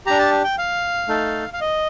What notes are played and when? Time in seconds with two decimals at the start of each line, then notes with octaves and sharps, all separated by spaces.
0.06 D4 G4 A#5
0.19 A5
0.44 G5
0.58 F5
1.08 A3 D#4 A4
1.53 F5
1.61 D#5